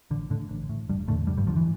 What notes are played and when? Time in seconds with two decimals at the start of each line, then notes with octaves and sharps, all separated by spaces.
0.11 A1 D3
0.30 A2 D3
0.49 A1
0.69 A2
0.89 F1 G2 G3
1.08 E2 A2 D3 A3
1.27 F1 G2 G3
1.37 G2 G3
1.47 F2 D3 F3
1.51 E2
1.56 E3